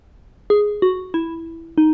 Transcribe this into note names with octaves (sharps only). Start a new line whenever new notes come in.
G#4
F#4
E4
D#4